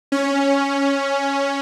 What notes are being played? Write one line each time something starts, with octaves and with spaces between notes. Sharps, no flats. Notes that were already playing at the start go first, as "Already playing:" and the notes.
C#4